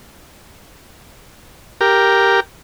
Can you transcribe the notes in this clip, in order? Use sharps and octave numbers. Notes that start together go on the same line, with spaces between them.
G4 A#4